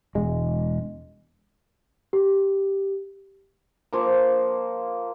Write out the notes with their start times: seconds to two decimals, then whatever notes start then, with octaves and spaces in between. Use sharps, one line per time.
0.15 E1 G#3
2.13 G4
3.93 F3 A#3